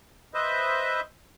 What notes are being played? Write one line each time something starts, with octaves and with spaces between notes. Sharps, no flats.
B4 C5 D#5 E5